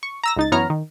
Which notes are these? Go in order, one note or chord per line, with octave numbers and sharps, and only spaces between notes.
C#6
A#5 E6 A#6
C#2 D#4 A6
F#2 E3 B3 C#5 A#5 F6
D#3